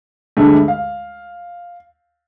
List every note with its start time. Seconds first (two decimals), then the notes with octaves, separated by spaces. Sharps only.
0.37 D2 G2 D3 G#3 A3
0.68 F5